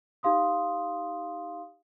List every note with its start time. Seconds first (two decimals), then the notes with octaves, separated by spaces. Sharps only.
0.23 D#4 G4 F5 C6 D#6